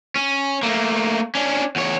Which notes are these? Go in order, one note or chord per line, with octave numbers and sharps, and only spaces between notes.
C#4
A3 A#3
C#4 D4
E2 C#5